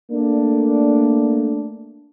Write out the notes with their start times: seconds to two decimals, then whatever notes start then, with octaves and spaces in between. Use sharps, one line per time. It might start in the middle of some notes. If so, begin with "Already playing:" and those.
0.11 A3 A#3 D4